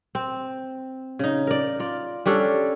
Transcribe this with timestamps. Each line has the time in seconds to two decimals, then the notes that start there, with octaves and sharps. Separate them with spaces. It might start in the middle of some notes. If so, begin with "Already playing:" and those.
0.15 C4
1.19 C#3 D#4
1.47 A#4 D5
1.80 F4 D5
2.26 G3 C#4 D4 A4